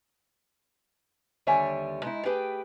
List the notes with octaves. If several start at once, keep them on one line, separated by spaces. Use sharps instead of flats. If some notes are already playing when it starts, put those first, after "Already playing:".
D#2 D3 G3 C#5 E5 G#5
G#3 D#4 E4
A3 G4 G#4 B4 G5